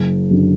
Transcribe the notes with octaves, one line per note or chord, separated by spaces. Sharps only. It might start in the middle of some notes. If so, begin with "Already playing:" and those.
Already playing: F#1
F#2 D3